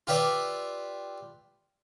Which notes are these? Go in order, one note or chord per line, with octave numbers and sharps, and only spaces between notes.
F4 G4 B4 D5 E5